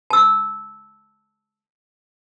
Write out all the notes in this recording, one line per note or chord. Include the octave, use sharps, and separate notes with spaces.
A5 E6